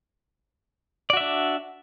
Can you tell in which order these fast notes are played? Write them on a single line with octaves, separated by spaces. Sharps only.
D5 F#4 E5 D4